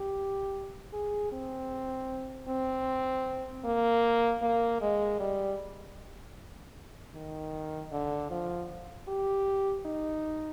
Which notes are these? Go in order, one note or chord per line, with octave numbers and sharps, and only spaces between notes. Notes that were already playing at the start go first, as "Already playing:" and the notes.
Already playing: G4
G#4
C4
C4
A#3
A#3
G#3
G3
D#3
D3
F3
G4
D#4